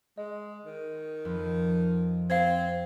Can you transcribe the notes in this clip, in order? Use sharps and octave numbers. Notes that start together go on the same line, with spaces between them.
G#3 D#5
D#3
F2 F3 B4
C4 F5 G#6